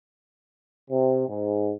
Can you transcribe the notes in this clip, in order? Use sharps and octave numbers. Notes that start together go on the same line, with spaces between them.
C3
G#2